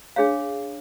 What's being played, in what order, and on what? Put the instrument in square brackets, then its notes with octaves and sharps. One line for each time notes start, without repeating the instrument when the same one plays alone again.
[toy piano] D4 G#4 C#5 F5